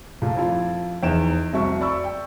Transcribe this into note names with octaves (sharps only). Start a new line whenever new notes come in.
A#2 A3
F2 E4 F4
E2 D#4 D7 E7
F1 C2 F#4 E5 C#6
D5 B5 C#6 E6
G5